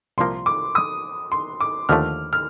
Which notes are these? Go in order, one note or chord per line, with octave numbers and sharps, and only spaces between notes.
C2 A#2 F3 A#3 C6
D6
D#6
C6
D6
D#2 D3 F3 A3 F6
F6